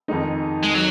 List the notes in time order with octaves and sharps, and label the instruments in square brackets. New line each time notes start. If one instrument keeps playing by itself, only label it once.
[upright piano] F2 D#3 G#3 D#4
[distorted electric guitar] G#3
F#3